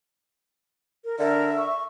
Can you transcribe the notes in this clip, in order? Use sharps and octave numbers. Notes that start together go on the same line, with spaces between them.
A#4
D3 A#4 E5
C#6